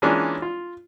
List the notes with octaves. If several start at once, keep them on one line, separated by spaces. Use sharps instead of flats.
E3 G#3 A#3 C#4 D4 F4
F4